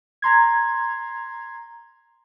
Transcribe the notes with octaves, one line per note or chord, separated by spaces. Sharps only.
A#5 C6 G#6